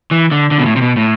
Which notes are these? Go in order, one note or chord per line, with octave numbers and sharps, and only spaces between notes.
E3
D3
D3
B2
A2
C3
B2
A2